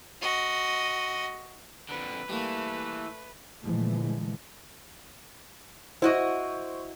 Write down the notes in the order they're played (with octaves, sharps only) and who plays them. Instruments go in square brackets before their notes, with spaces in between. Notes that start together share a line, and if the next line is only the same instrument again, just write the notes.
[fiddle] F#4 D#5
[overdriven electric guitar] F2 D3 [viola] B4
[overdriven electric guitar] E3 [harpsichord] G3 A#3 [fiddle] A3
[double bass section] A#2 D3 E3 F3 G#3 A3
[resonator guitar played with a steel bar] E4 F#4 D#5 [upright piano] C5 C#6